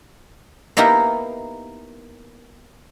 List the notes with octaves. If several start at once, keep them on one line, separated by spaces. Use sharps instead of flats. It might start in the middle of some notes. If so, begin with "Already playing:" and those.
A#3 B3 D#4 E4 G4 A#4